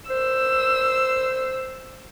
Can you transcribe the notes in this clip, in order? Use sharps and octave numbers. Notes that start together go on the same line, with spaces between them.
C5 E6